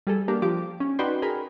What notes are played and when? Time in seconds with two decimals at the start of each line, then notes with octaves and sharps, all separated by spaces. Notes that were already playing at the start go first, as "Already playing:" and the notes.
0.07 G3 G#4 A4
0.28 A#3 D4 G4 A#4
0.42 F3 G4 D6
0.80 C#4
0.99 D#4 F#4 B4 D5 G5 C6
1.22 G#4 A#4 B5